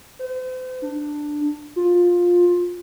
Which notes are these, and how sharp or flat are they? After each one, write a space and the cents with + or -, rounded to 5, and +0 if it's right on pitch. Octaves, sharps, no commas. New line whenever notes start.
C5 -40
D4 +10
F4 +15